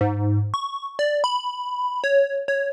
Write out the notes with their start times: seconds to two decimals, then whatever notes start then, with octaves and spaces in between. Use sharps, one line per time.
0.01 G#2
0.54 C#6
0.99 D5
1.24 B5
2.04 C#5
2.48 C#5